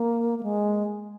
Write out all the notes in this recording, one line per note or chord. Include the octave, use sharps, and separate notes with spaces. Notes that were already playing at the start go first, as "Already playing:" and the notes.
Already playing: A#3
A#3
G#3